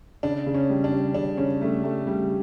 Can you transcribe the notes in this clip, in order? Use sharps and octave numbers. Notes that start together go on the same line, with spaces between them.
C#3 D4
C#3
C#4
G3
D4
G3
C#3 D4
C#3 C#4
G3 A3
G3 A3
C#3 G3